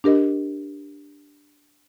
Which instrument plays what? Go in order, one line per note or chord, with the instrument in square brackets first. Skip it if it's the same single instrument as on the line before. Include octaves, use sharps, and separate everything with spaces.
[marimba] D4 G4 A#4 D#5